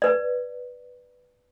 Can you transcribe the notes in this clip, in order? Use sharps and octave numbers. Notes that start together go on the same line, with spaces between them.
B4 D5